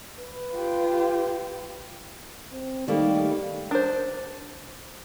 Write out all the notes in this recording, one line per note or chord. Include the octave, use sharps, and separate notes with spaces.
B4
F4 G4
C4
D#3 G3 A3 A#3
D4 C5